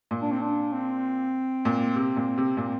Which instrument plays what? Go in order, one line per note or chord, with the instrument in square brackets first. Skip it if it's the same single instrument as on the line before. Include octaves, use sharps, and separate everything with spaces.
[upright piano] A#2
[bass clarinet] D4
C4
D4
C4
[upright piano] A#2
C3
A#2
C3
[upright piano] A#2 [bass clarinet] C4